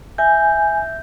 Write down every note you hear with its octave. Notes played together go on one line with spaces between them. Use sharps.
E5 G#5 G6